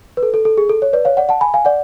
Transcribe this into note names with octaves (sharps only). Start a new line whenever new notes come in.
B4
A4
A4
A4
G#4
A4
C#5
B4 D5
C#5 F5
D5 F#5
F#5 A5
G#5 B5
F5 G#5
D5 F#5